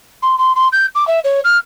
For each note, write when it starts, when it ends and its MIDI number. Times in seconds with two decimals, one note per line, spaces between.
0.22 0.38 84
0.38 0.52 84
0.56 0.68 84
0.72 0.86 91
0.95 1.07 86
1.07 1.20 76
1.24 1.40 73
1.44 1.57 89